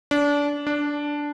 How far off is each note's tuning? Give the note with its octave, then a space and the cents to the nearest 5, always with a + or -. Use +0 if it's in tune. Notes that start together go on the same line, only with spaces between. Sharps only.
D4 -25
D4 -5